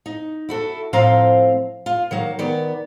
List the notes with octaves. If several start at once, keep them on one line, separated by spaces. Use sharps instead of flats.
D#4
E4 F#4 A4
A2 F3 C4 C5 F5 A#5
F4
D#3 F#3 A#3
D#3 B3 D5